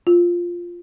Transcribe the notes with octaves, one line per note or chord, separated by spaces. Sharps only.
F4